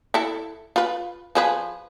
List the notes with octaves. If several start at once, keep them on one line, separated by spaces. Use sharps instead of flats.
E4 A4
F4 B4
F3 G#4 B4